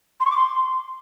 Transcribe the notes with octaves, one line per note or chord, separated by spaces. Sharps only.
C6
C#6
D6
C6